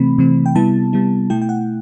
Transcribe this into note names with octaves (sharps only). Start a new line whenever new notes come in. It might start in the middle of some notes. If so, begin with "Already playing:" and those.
Already playing: C3 E3 A3 C4 B5
C3 E3 A3 C4
G5
C3 G3 B3 E4 A5
C3 G3 B3 E4
B2 A3 E4 G5
G5
F#5